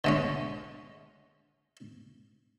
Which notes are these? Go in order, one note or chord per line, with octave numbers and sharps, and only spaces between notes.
D3 G#3 C#4